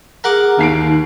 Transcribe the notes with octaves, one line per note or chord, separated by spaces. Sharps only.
G#4 A#4 F#5 D6
D#2 D#3 D#4 C7 D7